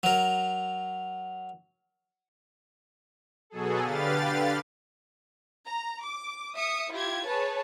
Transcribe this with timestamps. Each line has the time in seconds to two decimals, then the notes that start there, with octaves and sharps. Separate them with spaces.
0.03 F#3 A#4
3.50 B2 F#3 G#4 A4
3.82 D3 G4 B4 F5 A6
5.67 A#5
6.03 D6
6.55 E5 D#6 C#7
6.92 E4 F4 G4 G#6
7.28 G#4 B4 C#5 A5